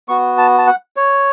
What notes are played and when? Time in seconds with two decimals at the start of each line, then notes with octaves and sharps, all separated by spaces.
0.09 B3 F#4 C#6
0.38 A5
0.58 A5
0.67 F#5
0.96 C#5